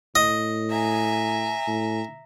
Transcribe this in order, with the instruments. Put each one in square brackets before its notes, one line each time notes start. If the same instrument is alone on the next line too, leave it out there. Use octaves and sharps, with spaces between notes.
[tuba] A2 [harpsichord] D#5
[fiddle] E5 A#5 [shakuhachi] G#5
[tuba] A2